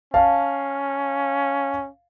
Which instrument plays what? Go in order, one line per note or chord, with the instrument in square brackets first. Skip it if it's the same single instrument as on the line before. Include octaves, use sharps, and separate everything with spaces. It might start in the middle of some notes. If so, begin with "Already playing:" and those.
[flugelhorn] C#4 [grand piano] F5 A5